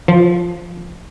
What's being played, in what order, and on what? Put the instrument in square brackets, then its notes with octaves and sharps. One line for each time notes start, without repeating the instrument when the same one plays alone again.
[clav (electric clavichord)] F3